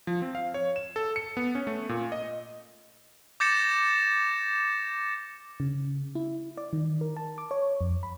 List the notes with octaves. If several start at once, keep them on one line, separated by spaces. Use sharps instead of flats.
F3
C4
F5
C#5
E7
A4
C#7
B3
C#4
A3
A#2
D#5
D6 G6 A6 A#6 C#7 E7
C#3
E4
D5
D#3
A#4
A5
D6
C#5
F2
B5